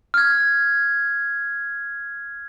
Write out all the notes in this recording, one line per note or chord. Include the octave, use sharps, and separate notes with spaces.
F6 G#6